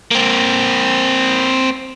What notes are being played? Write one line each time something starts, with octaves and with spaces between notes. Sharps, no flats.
A#3 C4